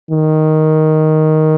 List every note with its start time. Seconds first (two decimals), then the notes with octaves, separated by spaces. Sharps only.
0.11 D#3